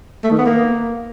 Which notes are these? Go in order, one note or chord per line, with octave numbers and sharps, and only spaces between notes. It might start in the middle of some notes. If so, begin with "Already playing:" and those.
A3
D#3
B3
A#3